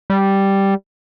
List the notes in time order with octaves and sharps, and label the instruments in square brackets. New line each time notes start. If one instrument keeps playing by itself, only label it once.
[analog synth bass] G3